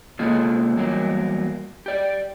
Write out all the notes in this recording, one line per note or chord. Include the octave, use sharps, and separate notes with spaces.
C3 G#3 A#3 F4 G#4 A4
E2 F#3 G3 A#3
G4 D5